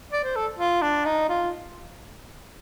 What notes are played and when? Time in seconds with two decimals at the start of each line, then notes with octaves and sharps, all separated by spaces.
0.12 D5
0.24 C5
0.36 A4
0.59 F4
0.82 D4
1.05 D#4
1.29 F4